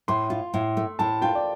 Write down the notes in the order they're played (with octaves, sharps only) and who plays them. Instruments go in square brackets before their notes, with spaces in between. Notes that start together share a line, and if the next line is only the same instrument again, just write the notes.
[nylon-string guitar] A2 [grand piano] C6
[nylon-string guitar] F4
A2
A3
[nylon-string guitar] A2 [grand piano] A5
[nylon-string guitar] F4 [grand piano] G5
[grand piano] D5